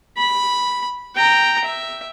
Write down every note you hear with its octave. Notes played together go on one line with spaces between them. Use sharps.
B5
G5 A#5
E5